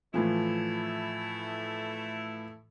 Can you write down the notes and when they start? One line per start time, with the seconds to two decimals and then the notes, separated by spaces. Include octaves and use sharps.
0.14 A2 E3 F3 A3 E4